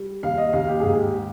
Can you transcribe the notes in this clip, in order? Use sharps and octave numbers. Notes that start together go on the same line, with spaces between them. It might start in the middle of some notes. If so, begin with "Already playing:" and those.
Already playing: G3
D#2 F5
D#5
D#2 F5
G4
G#2 G#4
G4